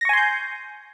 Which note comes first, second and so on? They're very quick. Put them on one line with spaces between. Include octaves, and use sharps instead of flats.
A#6 C#6 G#5 C6 G6